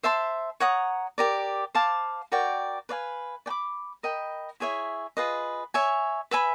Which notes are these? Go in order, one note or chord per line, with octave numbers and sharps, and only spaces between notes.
C5 E5 A5 C6
C#5 F#5 A#5 D#6
G4 A#4 D5
C5 F5 A5 D6
F#4 A#4 D5 G5
B4 D5 F5 G#5
D5 G5 B5 D6
A#4 D#5 G5 B5
E4 G#4 C#5 E5
F4 G#4 B4 D#5
C#5 E5 G#5
B4 E5 G#5 B5